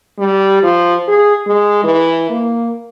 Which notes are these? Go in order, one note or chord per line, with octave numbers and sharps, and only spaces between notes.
G3
F3
G#4
G#3
E3
A#3